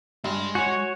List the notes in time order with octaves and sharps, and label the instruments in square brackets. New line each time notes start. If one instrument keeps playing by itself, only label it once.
[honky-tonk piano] G2 [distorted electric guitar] G#3 C6
[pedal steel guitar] F#4 C#5 [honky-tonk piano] G#5